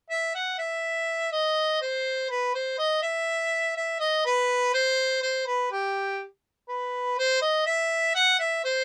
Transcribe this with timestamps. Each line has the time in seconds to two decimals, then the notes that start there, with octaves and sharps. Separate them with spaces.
0.10 E5
0.35 F#5
0.58 E5
1.32 D#5
1.81 C5
2.30 B4
2.54 C5
2.78 D#5
3.02 E5
3.77 E5
4.00 D#5
4.26 B4
4.74 C5
5.22 C5
5.47 B4
5.72 G4
6.69 B4
7.18 C5
7.42 D#5
7.66 E5
8.15 F#5
8.39 E5
8.64 C5